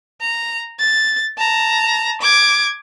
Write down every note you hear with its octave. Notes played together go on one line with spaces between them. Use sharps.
A#5
A6
A5 A#5
D6 G#6